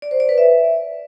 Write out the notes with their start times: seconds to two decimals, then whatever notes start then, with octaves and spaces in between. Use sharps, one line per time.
0.02 D5
0.11 C5
0.20 D5
0.29 B4
0.38 E5